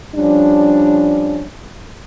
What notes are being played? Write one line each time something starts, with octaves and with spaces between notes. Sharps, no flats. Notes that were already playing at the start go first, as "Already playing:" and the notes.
F3 G3 C#4 D4